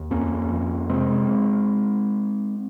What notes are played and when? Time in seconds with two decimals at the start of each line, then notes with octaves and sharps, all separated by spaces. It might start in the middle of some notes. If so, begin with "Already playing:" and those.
Already playing: D#2
0.11 F2 A#3 C#4
0.50 F2
0.89 C3 G#3 C4